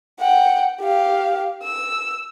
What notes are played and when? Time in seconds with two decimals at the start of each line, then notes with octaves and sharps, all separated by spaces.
0.20 F#5 G5
0.80 G4 F5
1.63 E6